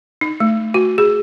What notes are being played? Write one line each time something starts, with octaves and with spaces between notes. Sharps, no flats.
D#4
A3
F#4
G#4